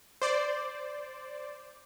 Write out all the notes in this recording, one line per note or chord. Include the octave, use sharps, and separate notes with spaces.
C5 D5